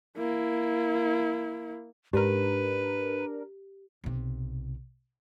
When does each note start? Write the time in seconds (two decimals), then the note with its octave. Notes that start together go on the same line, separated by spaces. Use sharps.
0.17 A#3 E4
2.13 G#2 D4 G4 A#4 B4
4.04 B1 C3